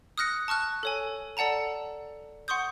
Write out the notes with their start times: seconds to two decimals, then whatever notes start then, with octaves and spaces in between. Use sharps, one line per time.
0.18 D#6 F6 F#6 A#6 C#7
0.48 A5 C#6 F6 F#6
0.83 A4 C#5 G#5
1.37 A4 D5 F#5 A5 A#5
2.48 F#5 C6 C#6 D#6 G6